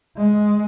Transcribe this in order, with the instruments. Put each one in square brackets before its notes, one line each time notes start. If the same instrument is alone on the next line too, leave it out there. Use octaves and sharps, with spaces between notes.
[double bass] G#3